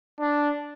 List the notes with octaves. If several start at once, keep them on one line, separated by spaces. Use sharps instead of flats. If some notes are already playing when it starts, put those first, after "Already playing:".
D4